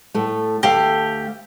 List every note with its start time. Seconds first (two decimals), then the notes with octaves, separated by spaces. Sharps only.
0.14 A2 A3
0.63 D2 A3 G4 F5